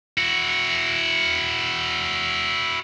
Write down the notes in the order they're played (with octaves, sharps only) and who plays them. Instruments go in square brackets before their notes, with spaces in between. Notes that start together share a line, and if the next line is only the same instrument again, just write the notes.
[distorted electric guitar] E4 F#4